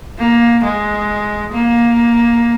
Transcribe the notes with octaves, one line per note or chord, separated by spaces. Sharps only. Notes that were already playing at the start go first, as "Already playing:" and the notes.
A#3
G#3
A#3